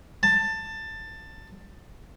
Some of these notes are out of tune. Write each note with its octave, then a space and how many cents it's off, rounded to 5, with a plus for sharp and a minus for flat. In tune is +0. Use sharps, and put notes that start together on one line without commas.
A5 +15